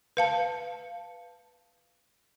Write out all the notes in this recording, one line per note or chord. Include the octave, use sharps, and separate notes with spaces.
B4 F5 A5